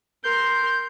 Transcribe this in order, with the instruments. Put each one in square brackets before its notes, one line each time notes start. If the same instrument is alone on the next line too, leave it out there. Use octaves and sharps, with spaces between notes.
[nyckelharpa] A#4 C6 [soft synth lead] G6